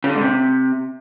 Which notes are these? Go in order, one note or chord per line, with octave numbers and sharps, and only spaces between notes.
C#3
D3
G#2
C3